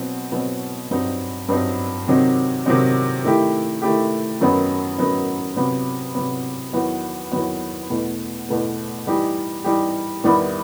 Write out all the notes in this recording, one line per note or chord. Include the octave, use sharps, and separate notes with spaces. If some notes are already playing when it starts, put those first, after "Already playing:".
Already playing: B2 F#3 C4
B2 F#3 C4
G2 F#3 C4 D#4
G2 F#3 C4 D#4
C3 D#3 F#3 C4 D#4
C3 D#3 F#3 C4 D#4
D#3 A3 E4 G4
D#3 A3 E4 G4
F#2 D#3 F#3 B3 D#4
F#2 D#3 F#3 B3 D#4
C3 F#3 B3
C3 F#3 B3
E2 D#3 F#3 B3 F#4
E2 D#3 F#3 B3 F#4
E2 B2 A3
E2 B2 A3
E3 G3 D#4 G4
E3 G3 D#4 G4
E2 D#3 G3 B3 E4